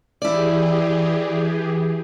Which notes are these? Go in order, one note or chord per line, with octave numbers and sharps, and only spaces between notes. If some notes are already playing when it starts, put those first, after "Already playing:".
E3 E4 G4 G#4 D5